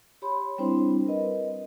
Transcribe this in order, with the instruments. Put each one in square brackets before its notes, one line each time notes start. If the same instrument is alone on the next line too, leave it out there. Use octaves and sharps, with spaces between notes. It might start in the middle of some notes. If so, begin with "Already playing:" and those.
[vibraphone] G4 C#5 B5 C6
G3 C4 D4 E4 C5
A#4 B4 D#5